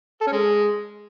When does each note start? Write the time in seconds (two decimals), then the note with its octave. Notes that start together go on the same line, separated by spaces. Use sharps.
0.21 A4
0.27 C#4
0.32 G#3